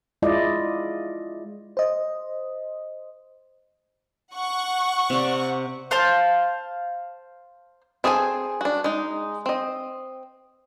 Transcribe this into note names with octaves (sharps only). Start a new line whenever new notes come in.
G#3 E4 F4 D5 D#5
C5 D#5
F#5 C#6
C3 D5
C5 F5 A5
C4 G#4 A4 C#5 G#5
D4 F#4
G#3 D#4
C4 D#5